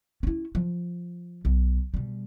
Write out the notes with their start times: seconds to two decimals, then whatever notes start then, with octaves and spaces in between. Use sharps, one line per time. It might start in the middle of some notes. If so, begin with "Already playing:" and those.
0.23 C#4 E4
0.55 F3
1.45 B1
1.94 B2 G3